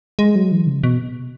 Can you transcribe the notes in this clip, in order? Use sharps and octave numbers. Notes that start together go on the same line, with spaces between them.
G#3
F#3
E3
C#3
B2